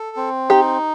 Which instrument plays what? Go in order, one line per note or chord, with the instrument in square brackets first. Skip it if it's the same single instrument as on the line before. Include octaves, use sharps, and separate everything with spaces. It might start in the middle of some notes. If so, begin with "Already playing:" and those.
Already playing: [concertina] A4
C4
[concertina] D#4 [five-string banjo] G4